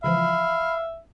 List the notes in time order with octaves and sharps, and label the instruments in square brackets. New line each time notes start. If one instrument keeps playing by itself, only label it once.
[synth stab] C#2 E3 F3 [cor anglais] E5 [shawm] F5 [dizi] B5